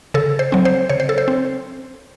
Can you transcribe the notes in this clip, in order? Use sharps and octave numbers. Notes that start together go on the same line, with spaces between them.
C#3 A4
C5
F#3 C4
C5
C#3 C#5
C5
A4
C5
C4